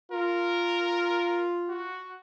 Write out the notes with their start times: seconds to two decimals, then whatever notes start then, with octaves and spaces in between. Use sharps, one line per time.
0.12 F4 A#4
1.68 F#4